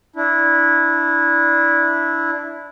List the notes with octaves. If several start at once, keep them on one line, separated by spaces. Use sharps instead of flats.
D4 E4